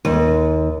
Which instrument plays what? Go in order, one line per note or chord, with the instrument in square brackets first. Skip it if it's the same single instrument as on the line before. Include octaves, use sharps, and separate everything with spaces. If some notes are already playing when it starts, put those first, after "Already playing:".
[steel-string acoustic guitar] D#2